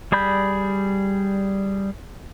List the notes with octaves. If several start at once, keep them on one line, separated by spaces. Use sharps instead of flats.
G3 G#4 D5 B5 G6